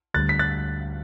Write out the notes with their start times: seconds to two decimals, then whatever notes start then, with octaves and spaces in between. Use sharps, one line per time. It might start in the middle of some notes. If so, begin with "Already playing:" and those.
0.14 D2 D3 G3 F#6 A6
0.29 B6
0.39 F#6 A6